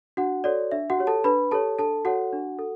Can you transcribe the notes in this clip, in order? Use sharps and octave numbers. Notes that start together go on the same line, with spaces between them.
D4 F#4 F#5
F#4 A4 C#5 D5
D4 E5
F#4 F#5
G4 C#5
A4 A5
D4 B4 B5
G4 A4 C#5 A5
D4 A4 A5
F#4 A4 C#5 F#5
D4
A4